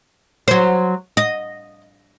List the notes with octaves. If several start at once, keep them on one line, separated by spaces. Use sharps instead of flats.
F#3 C5
D#5